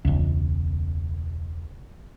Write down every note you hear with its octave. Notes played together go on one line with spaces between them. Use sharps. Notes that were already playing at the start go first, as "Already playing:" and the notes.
E1 C#2